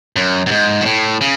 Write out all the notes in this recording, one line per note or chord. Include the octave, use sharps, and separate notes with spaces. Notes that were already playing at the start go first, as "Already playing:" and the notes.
F#2
F#2
G#2
B2
A2
C#3